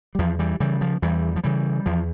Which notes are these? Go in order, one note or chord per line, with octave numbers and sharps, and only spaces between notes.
G3
E2 F3
E3 G3
C#3 E3 G3
F3
E2 E3 G3
F3
C#3 E3 G3
E2 F3